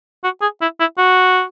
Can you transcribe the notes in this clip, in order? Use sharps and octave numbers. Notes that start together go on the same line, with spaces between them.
F#4
G#4
E4
E4
F#4